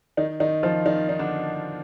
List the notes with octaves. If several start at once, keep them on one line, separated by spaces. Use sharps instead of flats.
D#3 D#4
D#3 D#4
F3 F4
D#3 D#4
D#4
D3 D4